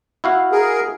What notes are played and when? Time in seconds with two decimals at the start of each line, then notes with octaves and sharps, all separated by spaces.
0.24 E4 F#4 F5
0.52 G#4 A#4